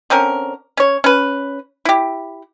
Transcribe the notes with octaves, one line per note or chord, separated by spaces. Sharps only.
D3 C4 C#4 A#4
C#4 C#5
C#4 B4
E4 G4